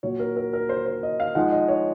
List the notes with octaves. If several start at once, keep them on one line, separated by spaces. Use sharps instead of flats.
A#2 F#3 C#5
A#4
A#4
A#4
C5
C5
D#5
F5
G#2 F3 G#3 F#5
D#5
C#5